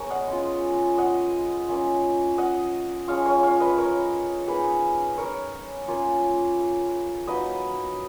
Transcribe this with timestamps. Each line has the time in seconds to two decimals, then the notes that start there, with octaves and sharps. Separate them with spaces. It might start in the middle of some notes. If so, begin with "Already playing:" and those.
Already playing: B3 G#4 A#4 C#5
0.10 D#5 F#5
0.28 G#3 C#4 F4
0.98 D#5 F#5
1.68 A#3 C#4 F4
2.38 D#5 F#5
3.08 F3 G#3 C#4 C#5 F5
3.25 C#5 F5
3.43 C#5 F5
3.60 B4 D#5
3.78 A#4 C#5
4.48 A#3 D#4 G#4 B4
5.18 A#4 C#5
5.88 A#3 C#4 F4
7.27 F#3 A#3 D#4 B4 D#5